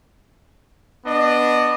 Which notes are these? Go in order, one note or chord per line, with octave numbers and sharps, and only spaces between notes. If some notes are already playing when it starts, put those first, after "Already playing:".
B3 D4 D#5